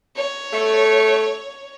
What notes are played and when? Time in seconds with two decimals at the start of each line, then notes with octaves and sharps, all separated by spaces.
0.17 C#5
0.52 A3